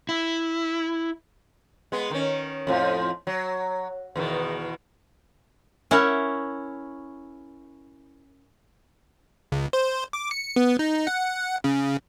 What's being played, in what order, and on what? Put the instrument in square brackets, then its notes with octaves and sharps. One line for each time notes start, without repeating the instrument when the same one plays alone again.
[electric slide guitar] E4
[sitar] G#3 B3
D#3 C#4
F2 A2 F3
F#3
E2 B2 D#3
[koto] C#4 E4 A#4 F#5
[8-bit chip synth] C#2
C5
D6
C#7
B3
D#4
F#5
C#3